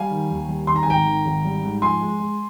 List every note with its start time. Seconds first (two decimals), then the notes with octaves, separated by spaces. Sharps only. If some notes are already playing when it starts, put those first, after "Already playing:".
Already playing: G3 F5 G#5
0.10 D#3
0.30 D#2
0.48 G3
0.67 D#3 C6
0.76 A#5
0.83 G#5
0.87 G#1 G5 A#5
1.06 D#3
1.25 G#1
1.45 G3
1.64 G#2
1.82 F3 G#5 C6
2.01 G#3
2.20 G#3